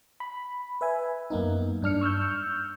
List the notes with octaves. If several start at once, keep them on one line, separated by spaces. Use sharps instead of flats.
B5
B4 E5 G#5
F#2 A#3 B3 D#4
G2 D4 F6 C#7
C#6 E6 F6 G6